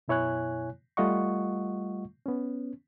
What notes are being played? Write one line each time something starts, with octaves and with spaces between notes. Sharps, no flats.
F#2 B2 E4 C#5 G#5 F#6
G3 A3 F4 D#5 F#5 C#6
B3 C#4